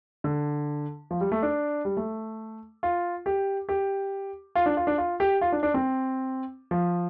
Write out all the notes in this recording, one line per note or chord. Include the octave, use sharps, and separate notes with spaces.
D3
F3
G3
A3
D4
G3
A3
F4
G4
G4
F4
D4
F4
D4
F4
G4
F4
D4
D4
C4
F3